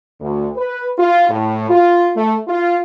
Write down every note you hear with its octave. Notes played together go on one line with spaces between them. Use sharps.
D2
B4
F4
A2
F4
A3
F4